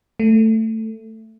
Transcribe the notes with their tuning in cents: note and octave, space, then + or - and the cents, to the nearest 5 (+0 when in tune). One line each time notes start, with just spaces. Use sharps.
A3 +10